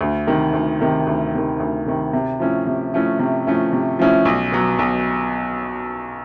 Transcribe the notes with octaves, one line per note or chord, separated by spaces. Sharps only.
D2
C3 D#3
D2
C3 D#3
D2
C3 D#3
D2
C3 D#3
C3
F3 A3 C#4 E4
C3
F3 A3 C#4 E4
C3
F3 A3 C#4 E4
C3
F3 A3 C#4 E4
B1
B2 F#3
B1